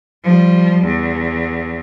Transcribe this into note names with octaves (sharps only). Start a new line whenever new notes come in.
F3 G3
E2